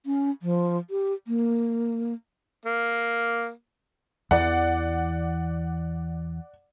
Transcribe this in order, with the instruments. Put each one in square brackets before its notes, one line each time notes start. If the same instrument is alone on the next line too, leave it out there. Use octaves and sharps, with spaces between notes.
[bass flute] C#4
F3
G4
A#3
[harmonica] A#3
[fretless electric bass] E2 E3 [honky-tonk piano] D5 F#5